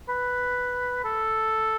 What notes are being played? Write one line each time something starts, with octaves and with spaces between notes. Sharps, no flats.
B4
A4